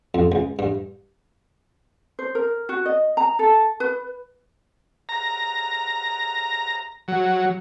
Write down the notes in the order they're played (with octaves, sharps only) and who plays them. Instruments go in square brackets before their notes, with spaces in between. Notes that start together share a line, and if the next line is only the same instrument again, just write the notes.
[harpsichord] F2
C#2
G2
[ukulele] C5
A#4
F#4
D#5
A#5
A4
B4
[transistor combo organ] A#5
F#3